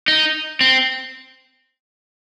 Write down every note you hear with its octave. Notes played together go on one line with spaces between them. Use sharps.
D#4
C4